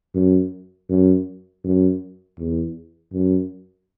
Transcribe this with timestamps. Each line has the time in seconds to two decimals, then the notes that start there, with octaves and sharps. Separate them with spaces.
0.15 F#2
0.89 F#2
1.64 F#2
2.38 E2
3.13 F#2